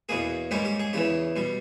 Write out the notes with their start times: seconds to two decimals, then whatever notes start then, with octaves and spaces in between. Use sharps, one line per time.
0.09 E2 B2 A#3 G#4
0.51 G#2 G3 A#3 C#4 G4
0.65 G4
0.79 G#4
0.93 E2 C#3 E3 G4
1.36 B2 G3